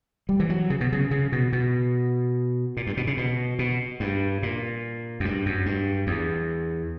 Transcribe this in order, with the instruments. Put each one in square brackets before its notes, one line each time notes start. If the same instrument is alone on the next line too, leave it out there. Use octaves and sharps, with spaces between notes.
[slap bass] G3
E3
F#3
C#3
B2
C#3
C#3
B2
B2
A#2
G2
B2
C#3
B2
B2
G2
A#2
F#2
G2
F#2
G2
E2